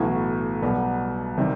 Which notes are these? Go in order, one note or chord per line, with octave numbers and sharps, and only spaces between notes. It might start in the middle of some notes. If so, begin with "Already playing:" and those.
Already playing: B1 A2 E3 B3 F#4
B1 B2 G3 B3
C3 D#3 G3